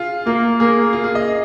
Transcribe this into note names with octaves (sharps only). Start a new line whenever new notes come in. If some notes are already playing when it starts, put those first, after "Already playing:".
Already playing: F4 G#4
A#3 F4
A#3 G#4
F4
G#4
D#5